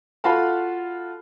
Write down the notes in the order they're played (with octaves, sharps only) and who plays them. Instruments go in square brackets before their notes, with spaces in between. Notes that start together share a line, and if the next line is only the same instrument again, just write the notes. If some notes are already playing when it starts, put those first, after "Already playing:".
[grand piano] F4 F#4 A4 F5 A5 B5